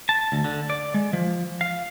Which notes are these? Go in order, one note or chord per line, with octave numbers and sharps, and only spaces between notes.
A5
D2
D3
D5
G#3
F3
F5